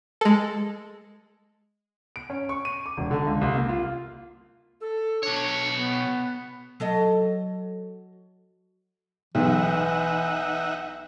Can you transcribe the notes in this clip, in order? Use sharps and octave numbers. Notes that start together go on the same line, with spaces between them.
G#3 A4
D7
C#4
C#6
D#7
D6
E1
D3
C#2
C2
A#3
F4
A4
B2 D4 C#5
B3
F#3 A4 D#5
B1 E3 D#4 E5 F#5